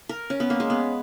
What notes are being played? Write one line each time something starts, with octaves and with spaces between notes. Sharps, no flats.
A#4
C#4
B3
A#3
G#3
B3